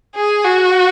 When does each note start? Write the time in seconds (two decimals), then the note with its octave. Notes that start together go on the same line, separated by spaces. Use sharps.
0.16 G#4
0.45 F#4